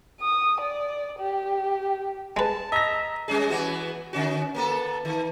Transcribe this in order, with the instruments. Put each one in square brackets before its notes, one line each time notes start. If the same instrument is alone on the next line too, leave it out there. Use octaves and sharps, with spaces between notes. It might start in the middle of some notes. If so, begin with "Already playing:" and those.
[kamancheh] D#6
D5
G4
[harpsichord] G#3 B4 [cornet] A5
[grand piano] D#5 A#6 [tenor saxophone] E5 [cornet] A#5
[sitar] G3 C#4 G#4
E3 B3 F#4
D3 C#4 F#4
A#3 B3 A4
D#3